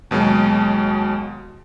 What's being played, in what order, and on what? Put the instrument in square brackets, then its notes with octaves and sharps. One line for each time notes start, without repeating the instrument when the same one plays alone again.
[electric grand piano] D#2 B2 F#3 G#3